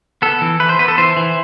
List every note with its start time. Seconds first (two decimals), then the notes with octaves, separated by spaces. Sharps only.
0.22 B3 A4
0.41 E3
0.60 E3 B4
0.69 C5
0.79 B3 B4
0.88 A4
0.98 E3 C5
1.17 E3